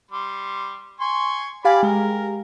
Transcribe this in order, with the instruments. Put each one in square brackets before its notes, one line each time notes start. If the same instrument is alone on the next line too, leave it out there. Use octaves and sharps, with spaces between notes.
[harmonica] G3 C6
G#5 C6 C#6
[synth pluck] G4 F5 G#5 [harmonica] D5 B5
[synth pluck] G#3 [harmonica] A#4